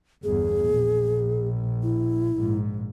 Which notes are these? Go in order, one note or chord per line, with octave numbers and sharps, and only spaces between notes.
G1 E2 G#4
A#1
E4
A#1 G#2